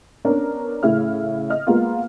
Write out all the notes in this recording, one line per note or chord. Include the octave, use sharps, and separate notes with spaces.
B3 C#4 D4 A#4
A2 C#3 E4 E5 F6
D#5 F6
G#3 A#3 B3 F4